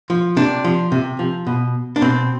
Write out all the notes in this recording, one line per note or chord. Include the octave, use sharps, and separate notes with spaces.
F3
C3 D4
F3
C3
F3
B2
D4
B2 C4